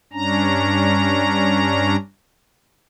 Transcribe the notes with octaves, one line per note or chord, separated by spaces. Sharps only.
G2 C#4 D4 A#5